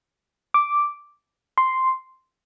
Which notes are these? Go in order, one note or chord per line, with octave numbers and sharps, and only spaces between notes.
D6
C6